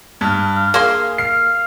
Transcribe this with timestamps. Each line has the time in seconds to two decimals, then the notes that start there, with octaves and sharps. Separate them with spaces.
0.21 G2 F6
0.56 F5
0.74 A#3 G#4 C6
1.18 F5 C7